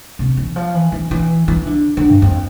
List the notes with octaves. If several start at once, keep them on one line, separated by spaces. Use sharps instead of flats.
C3
E3
F3
E3
E3
E3
E3
D3
D3
G2
F2